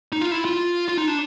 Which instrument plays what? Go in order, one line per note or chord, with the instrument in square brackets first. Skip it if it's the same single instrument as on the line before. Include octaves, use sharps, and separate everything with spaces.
[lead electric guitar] D#4
F4
E4
F4
F4
D#4
D4